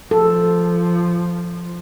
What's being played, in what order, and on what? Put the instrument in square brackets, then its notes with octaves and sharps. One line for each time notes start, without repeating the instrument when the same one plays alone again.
[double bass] F3 [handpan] A4